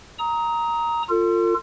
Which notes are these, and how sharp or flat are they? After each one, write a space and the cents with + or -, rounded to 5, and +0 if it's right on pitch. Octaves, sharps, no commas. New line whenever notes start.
A#5 +0 D#6 +25
F4 +0 A4 +40